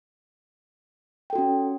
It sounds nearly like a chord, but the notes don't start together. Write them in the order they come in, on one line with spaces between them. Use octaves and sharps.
G5 A4 F#4 C#4